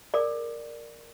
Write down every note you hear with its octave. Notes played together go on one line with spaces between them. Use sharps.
G#4 A#4 D5